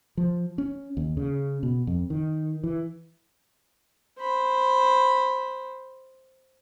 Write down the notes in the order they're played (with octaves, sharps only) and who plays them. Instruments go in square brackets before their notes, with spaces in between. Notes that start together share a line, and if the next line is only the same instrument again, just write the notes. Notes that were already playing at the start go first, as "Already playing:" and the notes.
[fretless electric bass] F3
C#4
D#2
C#3
B2
F2
D#3
E3
[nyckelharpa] C5 B5